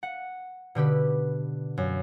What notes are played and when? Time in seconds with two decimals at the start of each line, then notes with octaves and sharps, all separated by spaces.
0.03 F#5
0.75 B2 D3 G4 B4
1.78 F#2